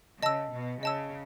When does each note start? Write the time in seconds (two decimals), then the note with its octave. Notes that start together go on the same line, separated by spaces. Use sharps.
0.22 C#3 D#5 A5 E6
0.52 B2
0.83 C#3 D#5 A5 E6